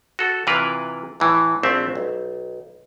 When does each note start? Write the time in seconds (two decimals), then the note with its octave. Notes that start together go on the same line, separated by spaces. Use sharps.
0.19 F#4 A4
0.47 C3 E3 E4 F4 A#4 B4
1.20 A2 E3
1.63 A#1 A3 C4 E5
1.95 B1